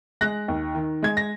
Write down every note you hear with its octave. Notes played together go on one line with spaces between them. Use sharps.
G#3 F#6 A#6
D#2
D#3
G#3 G#6
A#6